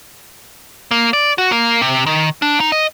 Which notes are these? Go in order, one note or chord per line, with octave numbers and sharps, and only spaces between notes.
A#3
D5
F#4
A#3
C3
D#3
D4
D#4
D#5